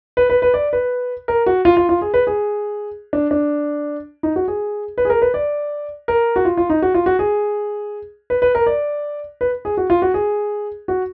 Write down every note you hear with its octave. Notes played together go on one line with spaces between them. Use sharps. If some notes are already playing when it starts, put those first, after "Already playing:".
B4
B4
B4
D5
B4
A#4
F#4
F4
F4
F4
G#4
B4
G#4
D4
D4
D#4
F#4
G#4
B4
G#4
A#4
B4
D5
A#4
F#4
F4
F4
D#4
F#4
F4
F#4
G#4
B4
B4
A#4
D5
B4
G#4
F#4
F4
F#4
G#4
F#4